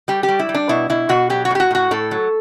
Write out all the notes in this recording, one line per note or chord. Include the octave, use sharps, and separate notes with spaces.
G3 G4
G4
G3
E4
G3
D4
B2 E4
B2 E4
B2 F#4
F#3 G4
F#4
A2 G4
F#4
A2 F#4
A2 A4
F#3